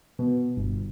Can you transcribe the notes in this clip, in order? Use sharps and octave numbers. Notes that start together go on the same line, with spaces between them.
B2
G1